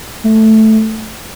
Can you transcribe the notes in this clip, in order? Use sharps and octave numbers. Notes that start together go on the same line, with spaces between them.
A3